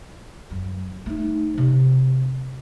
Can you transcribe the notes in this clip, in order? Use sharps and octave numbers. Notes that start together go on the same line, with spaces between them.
F#2
A3 D#4
C3 F3